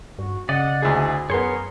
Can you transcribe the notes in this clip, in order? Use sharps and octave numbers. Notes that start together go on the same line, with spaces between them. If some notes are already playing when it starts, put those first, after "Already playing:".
G2 F#4
C#3 D5 D#5 F#5
D2 E4 G#4
F#2 B3 G#4 A#4 C#5 C6